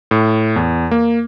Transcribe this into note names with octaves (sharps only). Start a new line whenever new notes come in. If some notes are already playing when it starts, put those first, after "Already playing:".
A2
E2
A#3